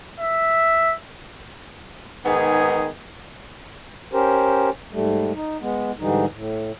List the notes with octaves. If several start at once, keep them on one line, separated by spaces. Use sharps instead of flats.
E5
G#2 D#3 B3 G#4
C#4 G4 A#4 C5
G#2 G3 A3
D#4
G#3 B3
G#2 D3 E3 G3 D#4
A2